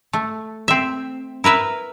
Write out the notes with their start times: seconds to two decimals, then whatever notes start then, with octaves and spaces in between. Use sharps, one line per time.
0.13 A3
0.68 C4 E5
1.44 E4 A#4 B4 E5